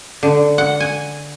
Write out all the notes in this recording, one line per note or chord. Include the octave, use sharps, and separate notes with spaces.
D3
F#5
G#5